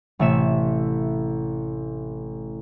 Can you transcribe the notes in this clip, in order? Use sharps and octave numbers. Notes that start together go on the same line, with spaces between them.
A1 C3 A3 E5 E7